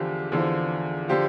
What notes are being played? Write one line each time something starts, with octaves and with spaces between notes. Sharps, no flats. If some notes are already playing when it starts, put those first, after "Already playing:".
Already playing: E2 D3 F3 G4
E2 D3 F3
D3 F3 G4